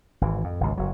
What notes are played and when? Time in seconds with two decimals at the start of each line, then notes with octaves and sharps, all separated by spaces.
0.21 G#1 E3
0.44 F2
0.61 G#1 C#2
0.78 F#1 F#3